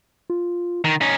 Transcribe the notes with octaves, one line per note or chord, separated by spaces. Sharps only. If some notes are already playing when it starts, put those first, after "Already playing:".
F4
D#3
C#4 D#4